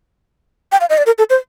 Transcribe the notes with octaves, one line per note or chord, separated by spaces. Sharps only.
G5
F5
D#5
D5
A#4
A4
C5